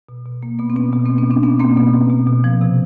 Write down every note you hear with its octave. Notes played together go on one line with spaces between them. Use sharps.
B2
B2
B2 A#3
B2 B3
C4
B2 B3 C#4
B2 B3
B2 A#3 C4
B3 C#4
B2 C4 D4
B2 B3 C#4
B2 A#3 C4
B2 B3
B2
B2
B2
F3
C3